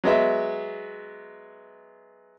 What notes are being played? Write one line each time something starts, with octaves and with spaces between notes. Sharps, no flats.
F#3 G#3 B3 E5